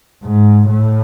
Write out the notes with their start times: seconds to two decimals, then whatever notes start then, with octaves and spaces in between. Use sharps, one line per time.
0.24 G#2
0.68 A2